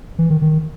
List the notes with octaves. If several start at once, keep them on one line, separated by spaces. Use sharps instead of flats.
E3
D#3
D#3